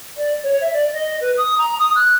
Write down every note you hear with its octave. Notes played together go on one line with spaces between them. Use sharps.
D5
C#5
E5
D5
D#5
B4
D#6
A#5
D#6
F#6